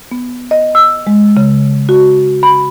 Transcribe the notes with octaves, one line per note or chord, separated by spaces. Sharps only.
B3
D#5
E6
G#3
C#3
F#4
B5